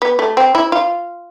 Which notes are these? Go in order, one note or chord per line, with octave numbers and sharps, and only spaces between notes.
B3
A3
C4
E4
F4